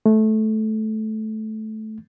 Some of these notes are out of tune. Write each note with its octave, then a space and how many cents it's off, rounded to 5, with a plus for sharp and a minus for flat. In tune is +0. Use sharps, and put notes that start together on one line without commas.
A3 -15